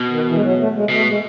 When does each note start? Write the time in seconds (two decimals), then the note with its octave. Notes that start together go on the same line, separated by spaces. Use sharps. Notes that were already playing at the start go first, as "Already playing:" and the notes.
Already playing: B2
0.09 D#3
0.25 E3
0.34 G#3
0.41 F#3
0.57 A3
0.73 G#3
0.90 B2 A3
1.06 G#3